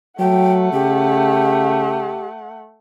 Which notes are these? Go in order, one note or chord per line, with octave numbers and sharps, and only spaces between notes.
F#3 A3 F#5 G5
C#3 G4